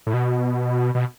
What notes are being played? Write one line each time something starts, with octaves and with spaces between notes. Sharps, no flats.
A2
B2
B2